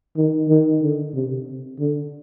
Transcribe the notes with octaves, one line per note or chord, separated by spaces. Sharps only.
D#3
D#3
D3
C3
D3